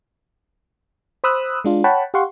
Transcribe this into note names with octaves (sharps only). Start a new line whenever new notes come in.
C5 B5 D#6 E6 F#6
G#3 D4 F4
C#5 F#5 G5 A5 B5
G4 F5 F#5 C6 C#6